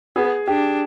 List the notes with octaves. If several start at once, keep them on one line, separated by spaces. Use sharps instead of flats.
B3 G#4
D4 G4